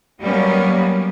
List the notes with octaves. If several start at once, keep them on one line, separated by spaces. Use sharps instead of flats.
F#3 G3 A#3 B3 C#4